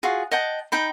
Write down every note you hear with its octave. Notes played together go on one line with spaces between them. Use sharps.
F4 F#4 G#4
D#5 F#5 G5 A5
D#4 G5 B5